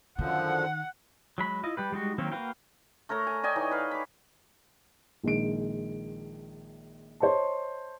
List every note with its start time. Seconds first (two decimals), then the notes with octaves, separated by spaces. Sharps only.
0.19 F#2 D3 D#3 F3 F#5
1.38 F#3 G#3 B5
1.63 E4 F4 D#5
1.77 G3 G4 B4
1.92 G3 G#3 D#4 F#4
2.18 D#3 F#3 A#3 C4
2.32 A#3 F#4 B4 F5 G5
3.09 A3 A#4 C#5 A#5
3.27 G#5
3.43 D5 D#5 G5 G#5
3.56 E3 D#4 C#5
3.71 B4 F5
3.91 B5 D6
5.23 A#1 D#3 G#3 D7
7.20 C5 C#5 D#5 A5